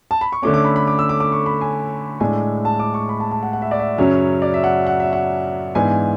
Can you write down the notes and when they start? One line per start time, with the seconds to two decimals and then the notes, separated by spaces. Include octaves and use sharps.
0.11 A5
0.21 B5
0.32 C#6
0.42 D3 A3 C#4 D6
0.54 D6
0.65 B5
0.76 B5
0.87 D6
0.99 E6
1.09 D6
1.20 D6
1.32 C#6
1.46 B5
1.61 G#5
2.20 A2 G#3 D4 G#5
2.65 A5
2.79 D6
2.94 C#6
3.09 B5
3.20 A5
3.31 A5
3.43 F#5
3.53 F#5
3.62 E5
3.71 D5
3.79 E5
3.98 F#2 C#3 F#3 C#4
4.42 D5
4.54 E5
4.64 F#5
4.87 F#5
5.00 E5
5.13 F#5
5.75 G#2 E3 B3 D4 G#5